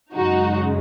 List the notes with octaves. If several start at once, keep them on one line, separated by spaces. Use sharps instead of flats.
F#2 C#3 G#3 D#4 F#4